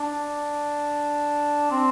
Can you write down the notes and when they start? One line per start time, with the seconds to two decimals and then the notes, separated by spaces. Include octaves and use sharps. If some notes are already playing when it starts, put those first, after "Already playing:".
Already playing: D4
1.71 C4